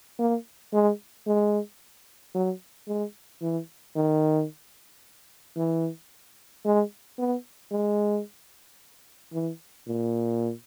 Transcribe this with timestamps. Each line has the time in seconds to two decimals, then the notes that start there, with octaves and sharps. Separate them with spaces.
0.19 A#3
0.73 G#3
1.27 G#3
2.35 F#3
2.88 G#3
3.42 E3
3.96 D#3
5.57 E3
6.65 G#3
7.18 B3
7.71 G#3
9.33 E3
9.87 A#2